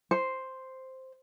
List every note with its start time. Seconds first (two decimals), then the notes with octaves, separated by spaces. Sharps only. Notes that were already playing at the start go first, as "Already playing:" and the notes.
0.11 C5